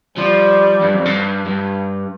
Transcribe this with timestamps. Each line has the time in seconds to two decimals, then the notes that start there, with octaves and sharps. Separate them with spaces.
0.17 F3 G3
0.82 G2
0.94 F2
1.05 G2
1.46 G2